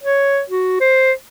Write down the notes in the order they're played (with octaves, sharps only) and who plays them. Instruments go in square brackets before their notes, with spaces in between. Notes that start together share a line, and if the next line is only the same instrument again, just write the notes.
[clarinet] C#5
F#4
C5